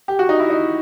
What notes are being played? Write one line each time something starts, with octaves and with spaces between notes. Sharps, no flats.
G4
F#4
D#4
E4
D#4